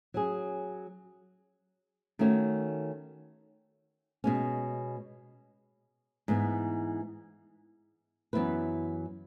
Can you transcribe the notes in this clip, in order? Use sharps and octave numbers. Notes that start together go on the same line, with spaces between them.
F#3 C#4 G#4
D#3 A3 C#4 F#4 C#5
B2 G#3 C#4
G#2 E3 B3
F#2 E3 B3 E4 B4